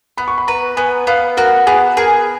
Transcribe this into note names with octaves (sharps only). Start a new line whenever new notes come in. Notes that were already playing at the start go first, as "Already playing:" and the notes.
B3 B5
C#6
B5
B4 A#5
B3 G#5
B3 F5
F#4 A#4
B3 G#4
G#4 A#4